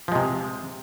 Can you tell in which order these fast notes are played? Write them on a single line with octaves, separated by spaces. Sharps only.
F3 G#3 C3